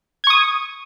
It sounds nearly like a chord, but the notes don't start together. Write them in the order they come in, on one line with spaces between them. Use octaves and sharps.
G#6 C#6 D#6